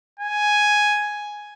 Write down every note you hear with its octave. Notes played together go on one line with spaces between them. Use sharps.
G#5